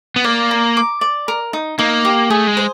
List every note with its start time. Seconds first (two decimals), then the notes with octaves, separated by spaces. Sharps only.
0.16 B3
0.24 A#3 D5
0.51 A#5
0.77 D6
1.01 D5
1.28 A#4
1.53 D#4
1.78 A#3 D#4
2.05 G4
2.30 A3 G#4
2.47 G#3
2.57 C5